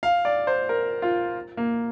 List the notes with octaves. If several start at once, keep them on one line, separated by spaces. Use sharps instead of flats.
F5
D5
C5
A#4
F4
A#3